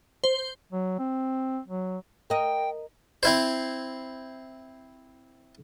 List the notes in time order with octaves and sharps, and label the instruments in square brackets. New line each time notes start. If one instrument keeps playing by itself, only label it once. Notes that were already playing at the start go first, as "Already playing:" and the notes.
[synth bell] C5
[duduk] F#3
C4
F#3
[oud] A#4 D#5 [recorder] G5
[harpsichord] C4 E4 C5